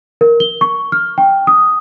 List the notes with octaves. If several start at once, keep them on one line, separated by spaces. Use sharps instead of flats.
A#4
G7
C#6
F6
G5
D#6